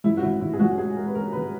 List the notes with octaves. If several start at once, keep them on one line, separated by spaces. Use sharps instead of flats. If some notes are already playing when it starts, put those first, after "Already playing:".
F#2 E4
F#4
G#1 E4
G#1 E4
G#4
F#2 F#4
G#3 G#4
G#3 A#4
B4
G#3 A#4
G#1 B4